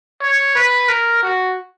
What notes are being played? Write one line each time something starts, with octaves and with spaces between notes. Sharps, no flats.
C#5
B4
A#4
F#4